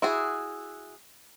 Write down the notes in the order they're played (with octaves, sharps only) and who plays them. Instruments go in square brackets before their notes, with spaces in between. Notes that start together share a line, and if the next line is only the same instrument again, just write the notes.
[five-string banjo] E4 F#4 G#4